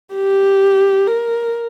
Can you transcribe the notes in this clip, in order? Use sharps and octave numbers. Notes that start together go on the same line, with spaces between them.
G4
A#4